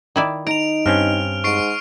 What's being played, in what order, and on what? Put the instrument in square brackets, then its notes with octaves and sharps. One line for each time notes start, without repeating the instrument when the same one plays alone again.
[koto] D#3 E4 D5
[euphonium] D#4 [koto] A#5 [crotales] D7 F7
[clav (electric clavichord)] G2 C4 C#4 [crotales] F6
[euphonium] G#2 [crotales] C#6 C7 D7